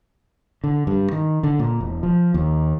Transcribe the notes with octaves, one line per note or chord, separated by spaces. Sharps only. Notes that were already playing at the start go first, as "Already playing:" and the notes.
D3
G2
D#3
D3
A#2
E1
F3
D#2